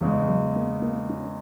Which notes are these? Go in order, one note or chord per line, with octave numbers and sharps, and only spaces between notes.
E2 C#3 E3 G#3
F#3
A#3
A#3
C#4